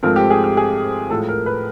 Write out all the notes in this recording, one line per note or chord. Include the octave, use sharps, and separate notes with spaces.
G#2 F3 A3 C4 A#4
G4
G#4
G4
G#4
A2 F3 G#3 A4
A#4
B4